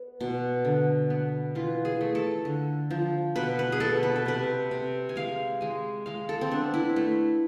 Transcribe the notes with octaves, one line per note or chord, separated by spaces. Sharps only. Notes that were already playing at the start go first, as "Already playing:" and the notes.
Already playing: B3
B2
D3
B3
E3 F4
G#4
A3
A4
D3
F3
B2 B4
B4
G#4
B2 A4
B4
A4
C3 B4
C3
G#5
G#3 F5
G#3 G#5
G#3 F5
A4
C4
B3 D4
E4
A3